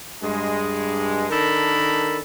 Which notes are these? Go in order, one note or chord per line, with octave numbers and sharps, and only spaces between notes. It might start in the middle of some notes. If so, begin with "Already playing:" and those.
G2 G#3
D#3 D4 A4 A#4 B5